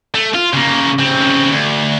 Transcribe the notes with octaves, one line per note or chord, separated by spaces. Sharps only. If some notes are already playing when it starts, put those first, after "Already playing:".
A3
F4
C#3 A#3
C#3 C4
D2